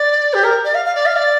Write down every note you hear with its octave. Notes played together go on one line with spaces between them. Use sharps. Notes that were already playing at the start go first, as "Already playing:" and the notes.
Already playing: D5
G4
A#4
D5
F5
F5
D5
F5
D5